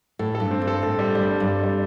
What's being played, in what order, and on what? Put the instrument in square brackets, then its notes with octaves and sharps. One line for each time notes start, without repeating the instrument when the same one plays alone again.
[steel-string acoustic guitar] A2 [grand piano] A4
[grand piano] A4
[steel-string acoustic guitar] G2
[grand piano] C4
[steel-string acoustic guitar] G2
[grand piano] A4
[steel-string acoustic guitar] A2 [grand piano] A4
[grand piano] G3
[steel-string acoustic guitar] G2 [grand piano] G3
[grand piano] A4
[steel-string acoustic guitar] G2
[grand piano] A4
G3